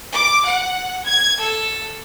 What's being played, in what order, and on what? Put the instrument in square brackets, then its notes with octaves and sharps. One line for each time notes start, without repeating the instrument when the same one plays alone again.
[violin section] D6
F#5
G#6
A4